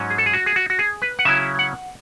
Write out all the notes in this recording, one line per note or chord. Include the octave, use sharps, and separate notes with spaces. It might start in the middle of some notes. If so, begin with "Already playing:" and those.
Already playing: G#2 F#3 C#4
G#4
A4
G#4
F#4
G#4
F#4
F#4
G#4
B4
F#5
C#3 F#3 C#4 E4 E5
F#5